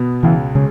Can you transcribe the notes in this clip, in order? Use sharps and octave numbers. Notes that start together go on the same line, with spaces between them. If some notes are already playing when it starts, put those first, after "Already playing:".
Already playing: B2 B3
C#2 E3
C#3 G#3